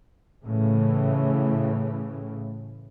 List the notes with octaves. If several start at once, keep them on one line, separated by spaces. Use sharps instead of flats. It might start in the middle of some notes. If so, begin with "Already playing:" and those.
A2 C#3 E3